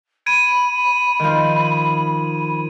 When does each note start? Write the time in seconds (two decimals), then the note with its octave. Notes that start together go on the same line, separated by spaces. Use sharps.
0.26 B5 G#6 D7 D#7
1.19 D#3 F3